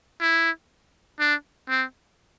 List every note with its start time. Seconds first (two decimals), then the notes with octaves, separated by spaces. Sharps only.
0.20 E4
1.20 D4
1.69 C4